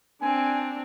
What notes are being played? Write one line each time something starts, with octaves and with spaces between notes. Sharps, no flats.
C4 D4 G#5